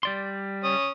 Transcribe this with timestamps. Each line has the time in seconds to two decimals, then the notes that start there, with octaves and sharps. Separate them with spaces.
0.03 G3 D5 C6
0.64 C#4 D#6